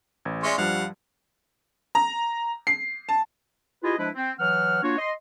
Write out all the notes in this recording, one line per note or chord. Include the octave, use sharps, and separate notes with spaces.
A1 G#6
G#3 C#4 D5 E5 C6 C#6
G2 F3 G3 F5 F#5
A#5
C7
A5
E4 F4 G4 G#4 B4 D#5
F3 G#3 D4 E4 B4
C4
E3 F#3 F#5 F6
A#3 D4 F4 F#4 C#5
D#5 C6